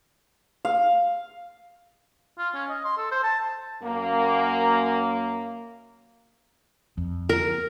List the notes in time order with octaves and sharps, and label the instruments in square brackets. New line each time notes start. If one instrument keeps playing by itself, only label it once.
[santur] F5
[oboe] F4
C#4
D#5
C6
A4
C5
A5
[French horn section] F#2 A#3
[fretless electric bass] F2
[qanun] A#4